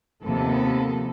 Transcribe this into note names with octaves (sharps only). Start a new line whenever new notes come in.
D#2 C3 D#3 F3 B3 A4